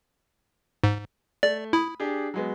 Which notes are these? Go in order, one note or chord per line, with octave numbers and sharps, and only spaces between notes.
G#2
A3 D5
E4 B5 D#6
D4 G4 G#4
F#3 G#3 B3